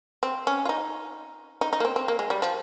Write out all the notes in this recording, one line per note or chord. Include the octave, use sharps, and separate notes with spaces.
C4
C#4
F4
D#4
D#4
D#4
A#3
C4
C4
A#3
G#3
G3
F3